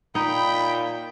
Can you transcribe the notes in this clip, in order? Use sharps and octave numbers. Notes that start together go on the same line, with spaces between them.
A#2 D#4 G5 B5